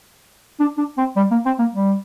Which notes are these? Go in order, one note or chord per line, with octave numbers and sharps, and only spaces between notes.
D4
D4
C4
G3
A#3
C4
A#3
G3